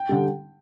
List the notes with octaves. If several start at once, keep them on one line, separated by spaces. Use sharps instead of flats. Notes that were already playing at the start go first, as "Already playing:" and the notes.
Already playing: G5
D3 G3